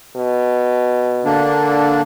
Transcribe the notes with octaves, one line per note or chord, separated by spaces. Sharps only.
B2
D3 A#3 D4